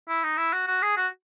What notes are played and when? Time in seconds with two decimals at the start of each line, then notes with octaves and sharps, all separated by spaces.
0.09 E4
0.24 D#4
0.37 E4
0.53 F#4
0.67 F#4
0.82 G#4
0.97 F#4